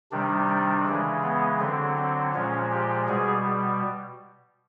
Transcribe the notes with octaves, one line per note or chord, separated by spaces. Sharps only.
C3 D#3 G3 D4
D4
C#3 E3 G#3
B3
D3 F#3 C4
C4
A#2 F3 G#3 C#4
G4
B2 G3 G#4